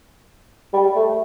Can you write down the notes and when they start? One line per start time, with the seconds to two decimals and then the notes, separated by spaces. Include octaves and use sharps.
0.73 G3
0.95 A3